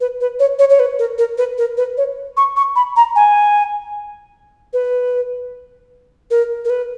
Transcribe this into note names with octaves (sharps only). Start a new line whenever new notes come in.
B4
B4
C#5
C#5
C#5
B4
A#4
A#4
B4
A#4
B4
C#5
C#6
C#6
B5
A#5
G#5
B4
A#4
A#4
B4